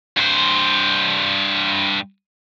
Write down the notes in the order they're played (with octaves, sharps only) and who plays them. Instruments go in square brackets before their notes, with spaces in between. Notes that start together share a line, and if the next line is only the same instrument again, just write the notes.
[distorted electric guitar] G2 C5